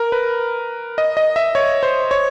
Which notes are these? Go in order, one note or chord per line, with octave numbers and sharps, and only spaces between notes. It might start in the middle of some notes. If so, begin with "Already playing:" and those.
Already playing: A#4
B4
D#5
D#5
E5
C#5
C5
C#5